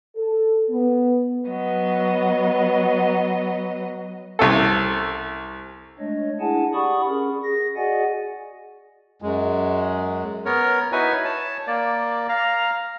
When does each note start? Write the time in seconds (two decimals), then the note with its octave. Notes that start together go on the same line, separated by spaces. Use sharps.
0.16 A4
0.70 B3
1.48 F#3 B3 D#5
4.39 C2 C#4 A4
5.99 G#3 A3 D4 C#5 D#5
6.40 D4 E4 G#4 F#5 G#5 A5
6.73 G4 D5 F#5 B5 C#6 D#6
7.07 C#4 G#4 A#4
7.43 G#4 A#6
7.76 F#4 G#4 D5 D#5 F#5 G#5
9.22 F#2 G#3
10.46 B3 A#4 C#5
10.92 D#4 E4 F#4 B4 C#5 G#5
11.25 C#5 A5
11.67 A#3 D5
12.29 F5 A#5